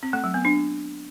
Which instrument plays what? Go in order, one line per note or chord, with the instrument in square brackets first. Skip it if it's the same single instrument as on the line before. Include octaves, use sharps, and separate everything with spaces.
[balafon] C4
A3
F#3
B3
D4